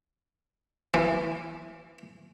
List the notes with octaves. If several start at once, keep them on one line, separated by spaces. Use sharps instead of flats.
E3